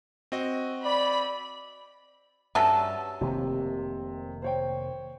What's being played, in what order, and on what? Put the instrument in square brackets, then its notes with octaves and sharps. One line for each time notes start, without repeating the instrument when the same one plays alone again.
[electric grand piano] C4 F#4 D#5
[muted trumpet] D5 [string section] B5
[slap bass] G2 [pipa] F#3 C#4 A4 [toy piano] E5 A5
[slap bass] F1 D#3 A#3 [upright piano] C3
[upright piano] C5 C#5 G5